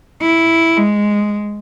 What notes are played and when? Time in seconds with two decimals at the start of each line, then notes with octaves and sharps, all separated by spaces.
0.22 E4
0.77 G#3